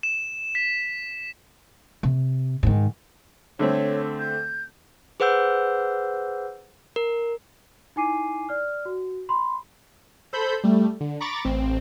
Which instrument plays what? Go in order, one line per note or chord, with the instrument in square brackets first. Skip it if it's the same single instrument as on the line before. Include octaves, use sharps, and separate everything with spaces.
[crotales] E7
B6
[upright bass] C3
G#2 D#3
[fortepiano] D3 A3 C4 [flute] C#5
[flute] G6
[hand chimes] G#4 B4 C5 F#5 E6 G6
A#4
[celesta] D#4 E4 G#5 D6 C7 D#7
D5 F6
F#4
B5 C6
[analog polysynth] A4 C5 B5 G6
G3 A3
D3
A#5 B5 C#6 D6 A6
A1 C4